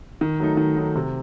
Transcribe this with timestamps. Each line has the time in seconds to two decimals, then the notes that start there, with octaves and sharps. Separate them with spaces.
0.21 D#3
0.40 F#3 A3 D#4
0.57 D#3
0.76 F#3 A3 D#4
0.96 C3